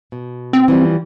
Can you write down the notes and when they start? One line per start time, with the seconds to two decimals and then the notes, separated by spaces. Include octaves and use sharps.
0.12 B2
0.53 C4
0.68 E3 F3 G3